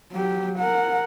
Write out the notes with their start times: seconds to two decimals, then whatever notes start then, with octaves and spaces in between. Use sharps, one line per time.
0.12 F#3 G4
0.59 A#4 F#5